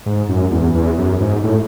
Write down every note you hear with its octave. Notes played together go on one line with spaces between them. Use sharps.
G#2
F#2
E2
E2
F#2
G#2
A2